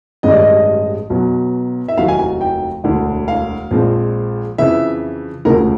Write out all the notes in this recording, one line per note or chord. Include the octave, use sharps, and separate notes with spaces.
A1 G2 D#3 G#3 D#5
D5
D#5
B1 B2 F#3 B3
E5
F1 D#2 D#3 F#3 F5
G#5
G#5
G5
E1 D2 D3
F5
A#1 A#2 F3 G#3 C4
F2 C#3 E3 E5
E1 D2 C#3 F3 A3 A#4